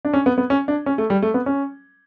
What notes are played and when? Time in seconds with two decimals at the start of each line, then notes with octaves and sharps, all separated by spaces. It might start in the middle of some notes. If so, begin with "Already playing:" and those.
0.05 D4
0.14 C#4
0.26 B3
0.38 B3
0.50 C#4
0.68 D4
0.86 C#4
0.98 A3
1.10 G3
1.22 A3
1.34 B3
1.46 C#4